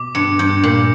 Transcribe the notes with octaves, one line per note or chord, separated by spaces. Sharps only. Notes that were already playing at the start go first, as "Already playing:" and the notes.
Already playing: B2 D6
G2 C#7
G2 G6
A#2 G6